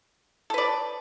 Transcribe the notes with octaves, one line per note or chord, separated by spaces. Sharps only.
A4 B4 D5